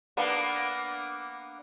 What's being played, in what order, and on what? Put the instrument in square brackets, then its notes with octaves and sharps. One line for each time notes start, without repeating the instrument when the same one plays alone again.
[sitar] A#3 B3 D4